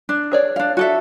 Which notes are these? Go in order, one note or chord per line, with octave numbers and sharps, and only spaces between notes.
D4
G#4 C#5 D5
D4 F5
F#4 A4 E5